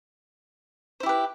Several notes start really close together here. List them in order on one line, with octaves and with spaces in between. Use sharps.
C5 E4 G4 B4